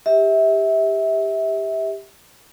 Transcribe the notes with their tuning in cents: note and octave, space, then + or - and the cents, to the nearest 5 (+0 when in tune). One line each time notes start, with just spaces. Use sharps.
G4 +15 E5 -25